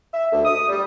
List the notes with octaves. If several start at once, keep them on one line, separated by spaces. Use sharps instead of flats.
E5
D2
D#6
G3